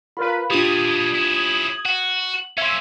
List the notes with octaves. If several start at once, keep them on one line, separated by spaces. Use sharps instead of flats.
F4 A#4 B4 B5
A#2 G3 D4 F4 G4 D#6 G#6
C#4 E4
F#4 F#5
A#3 C#4 E5 C6 G#6